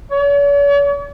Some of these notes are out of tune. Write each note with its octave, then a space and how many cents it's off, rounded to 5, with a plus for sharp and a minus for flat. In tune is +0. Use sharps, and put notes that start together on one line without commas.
C#5 +45